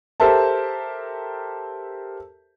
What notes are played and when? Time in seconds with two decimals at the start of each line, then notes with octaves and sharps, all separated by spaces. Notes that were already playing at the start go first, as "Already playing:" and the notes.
0.20 G4 A4 A#4 C5 E5 A5